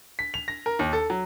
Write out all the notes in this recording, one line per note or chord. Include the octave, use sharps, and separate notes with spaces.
B6
F7
A#6
A#4
D#2
A4
F#3